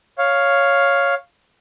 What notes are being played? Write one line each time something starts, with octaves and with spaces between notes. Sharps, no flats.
C#5 F5